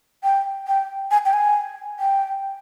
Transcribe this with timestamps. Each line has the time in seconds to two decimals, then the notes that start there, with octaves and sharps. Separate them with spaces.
0.23 G5
0.67 G5
1.11 G#5
1.26 G5
1.33 G#5
1.99 G5